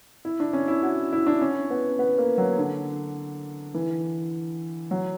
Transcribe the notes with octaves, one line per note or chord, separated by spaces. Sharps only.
E4
D4
C#4
E4
F#4
E4
D4
C#4
B3
B3
A#3
F#3
D3
E3
F#3